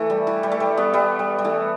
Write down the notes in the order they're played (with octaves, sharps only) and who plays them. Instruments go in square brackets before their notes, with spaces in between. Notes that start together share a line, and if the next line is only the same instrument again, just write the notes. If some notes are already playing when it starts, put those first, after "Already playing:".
Already playing: [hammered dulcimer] E3 A3
G3
E3
G3
A3
G3
G3 B3
G3 B3
G3
G3
E3 A3